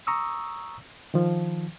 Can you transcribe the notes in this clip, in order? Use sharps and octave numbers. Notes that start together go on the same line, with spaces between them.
A#5 C#6 D#6 E6
D#3 F3